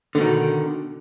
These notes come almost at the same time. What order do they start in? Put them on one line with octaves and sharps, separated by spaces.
D3 B2 D#3